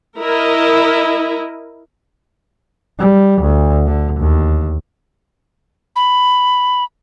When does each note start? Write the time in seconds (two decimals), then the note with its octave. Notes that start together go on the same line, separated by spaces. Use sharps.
0.18 E4 A#4 D#5
2.99 G3
3.42 D2
3.86 D3
4.20 D#2
5.96 B5